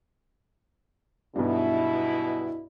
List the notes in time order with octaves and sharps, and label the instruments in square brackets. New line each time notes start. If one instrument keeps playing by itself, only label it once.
[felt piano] B1 G2 [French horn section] B2 E4